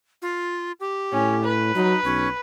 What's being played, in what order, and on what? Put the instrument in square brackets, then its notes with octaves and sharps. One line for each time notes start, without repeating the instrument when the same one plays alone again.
[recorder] F4
G4
[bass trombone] A2 [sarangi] C#4
[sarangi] B4
[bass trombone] F#3 [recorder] D#4
[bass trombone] B1 [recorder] C#4